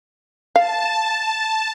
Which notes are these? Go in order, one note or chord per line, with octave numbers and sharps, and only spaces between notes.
F5 A5